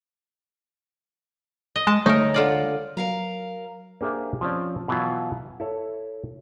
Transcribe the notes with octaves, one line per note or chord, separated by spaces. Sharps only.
D#5
G#3 A5
D2 G#3 A3 D#4 A#4 C#5
D3 F4 D5
F#3 A#4 F5 A#5
A#3 D4 G4 G#4 C5 E5
F3 C4 C#4 D5
B2 E3 F#3 E4 F4
E4 A4 C#5